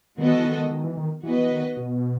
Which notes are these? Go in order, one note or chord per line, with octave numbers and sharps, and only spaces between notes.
D#3 G#3 B3 F#4 A4 D#5
E3
D#3
D#3
D#3
E3
D#3
E3 B3 F#4 B4 D#5
E3
D#3
B2